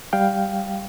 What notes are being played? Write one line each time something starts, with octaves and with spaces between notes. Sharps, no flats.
G3 F5 G5